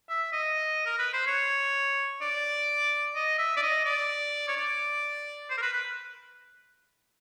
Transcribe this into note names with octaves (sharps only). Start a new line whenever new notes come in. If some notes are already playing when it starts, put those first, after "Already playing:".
E5
D#5
A#4
B4
C5
C#5
D5
D#5
E5
D5
D#5
D5
C#5
D5
C5
A#4
B4
B4